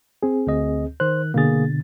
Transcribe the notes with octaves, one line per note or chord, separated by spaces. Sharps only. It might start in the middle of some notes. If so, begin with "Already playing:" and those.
C4 G#4
D2 D#5
D#3 C5 F#6
B2 D3 A#3 G#4 A6